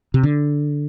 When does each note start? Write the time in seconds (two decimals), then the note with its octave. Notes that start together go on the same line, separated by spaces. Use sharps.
0.14 C3
0.23 D3